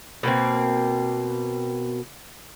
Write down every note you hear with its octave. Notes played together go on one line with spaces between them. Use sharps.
B2 A#3 C4